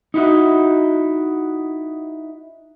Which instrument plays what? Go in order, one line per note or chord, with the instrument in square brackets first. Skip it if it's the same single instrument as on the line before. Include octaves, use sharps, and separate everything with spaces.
[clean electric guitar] D#4 E4 F#4